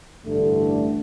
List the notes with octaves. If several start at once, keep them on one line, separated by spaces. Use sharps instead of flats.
A1 G2 D3 A3